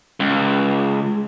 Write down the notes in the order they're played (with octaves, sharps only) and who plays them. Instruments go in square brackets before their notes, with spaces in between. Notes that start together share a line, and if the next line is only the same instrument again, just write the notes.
[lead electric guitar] C#2